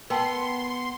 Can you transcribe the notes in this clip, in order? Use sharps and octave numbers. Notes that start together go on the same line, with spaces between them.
B3 A#4 G5 A5 C6